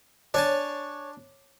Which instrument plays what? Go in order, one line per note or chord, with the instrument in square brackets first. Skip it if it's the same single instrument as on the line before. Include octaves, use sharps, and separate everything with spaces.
[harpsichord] D4 G#5 A5 [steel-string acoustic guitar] C#5